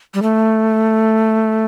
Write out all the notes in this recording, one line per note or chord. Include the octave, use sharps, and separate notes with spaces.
G3
A3